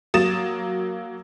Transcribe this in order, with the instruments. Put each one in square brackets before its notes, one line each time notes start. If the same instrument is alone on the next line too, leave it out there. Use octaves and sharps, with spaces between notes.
[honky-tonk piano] F#3 A#3 D#6 A6 E7